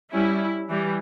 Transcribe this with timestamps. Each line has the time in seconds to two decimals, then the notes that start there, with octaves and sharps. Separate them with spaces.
0.13 G3 C#4 E4
0.69 E3 G3